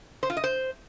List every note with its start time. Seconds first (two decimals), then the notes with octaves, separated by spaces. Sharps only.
0.23 C5
0.30 F4
0.37 D#5
0.44 C5